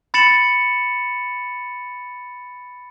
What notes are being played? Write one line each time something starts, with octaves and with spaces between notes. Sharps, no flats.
B5 A6 C#7 E7 F#7